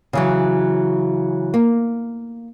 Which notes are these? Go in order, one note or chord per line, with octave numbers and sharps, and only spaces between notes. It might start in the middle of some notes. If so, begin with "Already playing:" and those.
C#3 E3 F#3
A#3